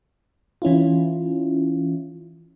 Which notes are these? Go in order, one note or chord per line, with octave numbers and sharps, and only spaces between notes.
E3 C#4 E4 F4